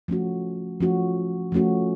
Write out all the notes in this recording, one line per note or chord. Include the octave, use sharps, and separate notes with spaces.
F3 A3 C#4 F#4
F3 A3 C#4 F#4
F3 A3 C#4 F#4